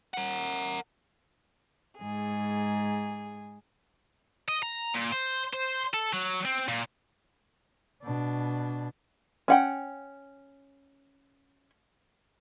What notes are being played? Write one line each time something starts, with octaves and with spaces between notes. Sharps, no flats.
A#4 F#5
G#2 G#4
D#5
A#5
A#2
C5
C5
A4
F#3
C4
A#2
B2 D4
C#4 F#5 G5